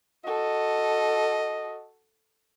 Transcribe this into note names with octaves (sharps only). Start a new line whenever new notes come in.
F#4 A4 D#5